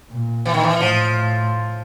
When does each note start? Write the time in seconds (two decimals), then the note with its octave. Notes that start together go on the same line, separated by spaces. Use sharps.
0.11 A#2
0.46 E3
0.54 D#3
0.63 E3
0.80 A2 F3